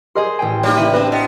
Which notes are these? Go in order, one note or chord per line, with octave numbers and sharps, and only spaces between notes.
G4 G#4 A#4 C5 D#5 C6
A1 G5 G#5
G3 A#3 D#4 C#5
C#3 E3 B5 D#7
C4 D4 B4 E5 A#5
B3 A#4 D#5 A#5